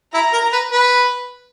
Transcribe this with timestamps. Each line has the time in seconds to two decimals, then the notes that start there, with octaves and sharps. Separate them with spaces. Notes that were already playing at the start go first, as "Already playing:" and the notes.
0.14 E4 A#5
0.33 A#4
0.53 B4
0.72 B4